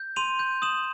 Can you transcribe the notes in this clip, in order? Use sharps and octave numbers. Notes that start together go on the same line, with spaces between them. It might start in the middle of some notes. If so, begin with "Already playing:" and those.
Already playing: G6
C6 D#7 F7
G6
D#6 E7 F#7